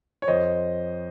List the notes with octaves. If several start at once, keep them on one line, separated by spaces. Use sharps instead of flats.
C#5
F2 C5 D#5